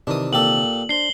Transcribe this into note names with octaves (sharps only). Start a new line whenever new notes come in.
C3 D#3 E3 D4 D#6
A#2 G4 A4 F#7
D4 C5 C7 G7